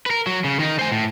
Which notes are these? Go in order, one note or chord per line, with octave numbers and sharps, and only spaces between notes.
A#4 B4
F#3
C#3
D#3 D#4
C5 G#5
A2